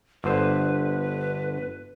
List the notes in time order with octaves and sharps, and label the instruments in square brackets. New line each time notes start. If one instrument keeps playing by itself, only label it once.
[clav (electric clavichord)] G1 D3 C5 [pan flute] B4